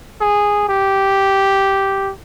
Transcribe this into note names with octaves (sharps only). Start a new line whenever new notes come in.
G#4
G4